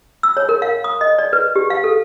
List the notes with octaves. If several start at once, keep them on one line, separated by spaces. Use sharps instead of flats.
E6
C#5
A#4
F5
D#6
D#5
D5
B4
G4
F5
A4